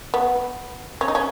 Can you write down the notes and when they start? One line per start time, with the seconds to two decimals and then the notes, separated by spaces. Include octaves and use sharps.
0.14 B3
1.01 C#4
1.08 D#4
1.15 C#4